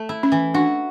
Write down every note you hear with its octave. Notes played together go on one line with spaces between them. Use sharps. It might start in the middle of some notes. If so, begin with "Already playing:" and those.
Already playing: A3
E4
C#4
E3
D4 F#4